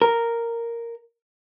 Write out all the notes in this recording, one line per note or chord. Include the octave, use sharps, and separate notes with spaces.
A#4